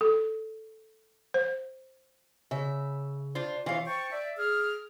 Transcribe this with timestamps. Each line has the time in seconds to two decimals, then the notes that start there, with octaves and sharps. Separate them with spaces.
0.01 A4
1.34 C5
2.51 C#3 E5
3.35 D4 F4 C5
3.66 E3 F4 C#5 F5
3.85 C5 G5 A5 C#6
4.12 D5 E5
4.38 G#4 F6